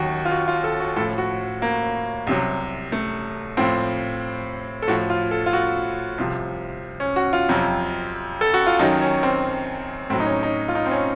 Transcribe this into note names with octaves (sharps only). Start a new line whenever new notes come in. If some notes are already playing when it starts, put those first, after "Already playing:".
Already playing: D#2 D#3 F#3 F#4
F4
F#4
F4
A4
F#4
A2 F3 A4
F#4
A#3
C2 C3 F#3
A3
A2 F3 C4
A4
A2 F3 F#4
F4
A4
F4
F#4
C2 C3 F3
C#4
F#4
F4
F2 C3 F#3
A4
F#4
F4
F#2 D#3 F#3 D#4
C#4
C4
A2 F#3 C4
D#4
C#4
D#4
F4
D#4
C4
C#4